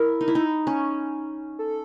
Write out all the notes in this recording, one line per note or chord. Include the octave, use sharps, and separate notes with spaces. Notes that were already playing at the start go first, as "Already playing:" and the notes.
Already playing: E4 A#4
D#4
E4
D#4
C#4
A4